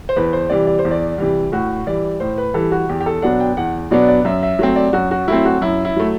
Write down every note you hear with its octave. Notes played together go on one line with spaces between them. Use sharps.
C5
E2 B4
C5
C3 E3 G3 D5
D5
C5
E2
D5
C3 E3 G3
A2 F#4
E3 G3 D5
A2 C5
B4
E3 G3 A4
F#4
E2 G4
G4
A4
B2 F#3 B3 D4 F#5
G5
E2 F#5
B2 F#3 B3 D4 D5
D5
F#2 E5
E5
F#3 A3 C4
D5
F#2 F#4
F#4
F#3 A3 C4 E4
F#4
F#2 E4
E4
F#3 A3